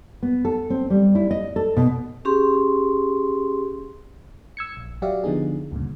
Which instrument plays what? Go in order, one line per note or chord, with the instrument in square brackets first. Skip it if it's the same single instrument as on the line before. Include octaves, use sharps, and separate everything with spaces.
[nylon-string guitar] B3
A4
C4
G3
E4
D#5
A4
B2
[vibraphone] C#4 G4 G#4 C6
[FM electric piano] E6 G#6 C#7
A#1
F#3 F#4 G4 D5 E5 F5
D3 F3 B3 D#4 G#4
D2 G2 A#2 C#3